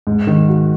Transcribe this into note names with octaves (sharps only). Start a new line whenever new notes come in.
G#2
D#3
F#4